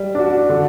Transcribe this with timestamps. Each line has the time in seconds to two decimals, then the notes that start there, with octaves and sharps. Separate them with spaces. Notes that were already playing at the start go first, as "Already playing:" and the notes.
Already playing: G3
0.15 D4 F#4
0.49 D3